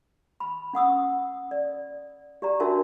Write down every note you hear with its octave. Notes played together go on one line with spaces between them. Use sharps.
B5
C#4 F#5 D#6 E6
D5
G4 D5 A#5
D4 F#4 A#4 C#5 E5 A5